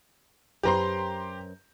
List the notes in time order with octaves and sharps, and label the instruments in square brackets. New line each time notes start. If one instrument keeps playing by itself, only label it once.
[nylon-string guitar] F#2 B4 C5 [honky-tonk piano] G4 A#5 C6